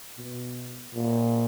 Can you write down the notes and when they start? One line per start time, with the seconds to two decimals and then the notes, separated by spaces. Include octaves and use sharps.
0.17 B2
0.94 A#2